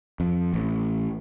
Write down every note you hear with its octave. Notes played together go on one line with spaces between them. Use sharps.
F2
A1